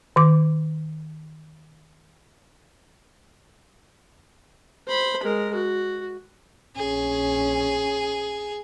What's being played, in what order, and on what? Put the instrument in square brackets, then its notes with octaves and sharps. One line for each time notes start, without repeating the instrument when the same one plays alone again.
[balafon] D#3 D6
[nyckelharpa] C5 B5
G#3 A#4
F#4
[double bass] A#1 C#4 [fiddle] G#4